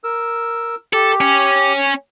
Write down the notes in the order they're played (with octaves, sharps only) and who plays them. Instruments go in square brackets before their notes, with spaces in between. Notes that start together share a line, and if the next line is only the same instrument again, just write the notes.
[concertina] A#4 E6
[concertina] G4 [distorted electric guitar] A4
[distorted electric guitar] C#4